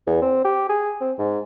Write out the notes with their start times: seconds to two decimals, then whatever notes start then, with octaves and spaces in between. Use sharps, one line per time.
0.07 E2
0.22 C4
0.45 G4
0.69 G#4
1.01 C4
1.19 G#2